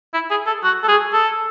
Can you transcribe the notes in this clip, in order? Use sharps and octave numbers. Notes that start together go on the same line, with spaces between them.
E4
G#4
A4
F#4
A4
G#4
A4